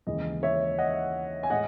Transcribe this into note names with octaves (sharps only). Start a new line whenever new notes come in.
D#2 C#3 E3 G#3 D#5
C#5 E5
D#5 F#5
G#5
A2 G#3 D#5 F#5